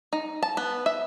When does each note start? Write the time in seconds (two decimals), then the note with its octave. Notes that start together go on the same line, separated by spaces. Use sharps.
0.13 D#4
0.43 A5
0.57 B3
0.86 E5